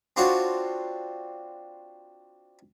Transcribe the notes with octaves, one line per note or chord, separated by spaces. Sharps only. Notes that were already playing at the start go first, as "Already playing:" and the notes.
C4 D4 F4 F#4 C#5